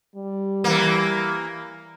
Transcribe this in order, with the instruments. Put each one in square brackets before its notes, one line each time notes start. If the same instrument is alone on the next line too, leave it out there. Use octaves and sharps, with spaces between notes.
[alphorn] G3
[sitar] E3 A#3